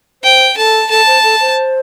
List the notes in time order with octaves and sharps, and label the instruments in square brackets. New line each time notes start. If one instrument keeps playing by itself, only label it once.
[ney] C5 [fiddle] G5
[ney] A4 [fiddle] A5
[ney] A4 [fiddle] A5
[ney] C5
A4
C5